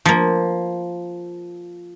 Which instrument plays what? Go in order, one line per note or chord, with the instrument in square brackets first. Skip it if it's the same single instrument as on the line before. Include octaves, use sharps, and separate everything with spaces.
[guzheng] F3 A#3